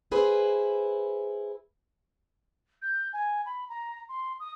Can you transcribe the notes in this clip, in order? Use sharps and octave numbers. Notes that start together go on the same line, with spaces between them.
E4 G#4 B4 C5
G6
G#5
B5
A#5
C6
D#6